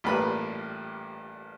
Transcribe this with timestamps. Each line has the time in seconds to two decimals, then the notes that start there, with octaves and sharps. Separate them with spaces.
0.04 A1 G2 A#2 A#3 B4 B5